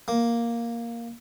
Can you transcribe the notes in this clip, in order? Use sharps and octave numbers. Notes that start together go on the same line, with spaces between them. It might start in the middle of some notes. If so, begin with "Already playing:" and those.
A#3